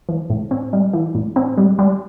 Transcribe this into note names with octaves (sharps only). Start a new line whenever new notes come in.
E3
A2
C4
G3
E3
A2
C4
G3
G3